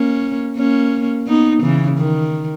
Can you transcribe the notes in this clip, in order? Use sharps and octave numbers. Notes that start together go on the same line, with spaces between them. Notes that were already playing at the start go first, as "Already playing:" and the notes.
Already playing: A#3 C#4
A#3 C#4
B3 D#4
C#3 E3
D#3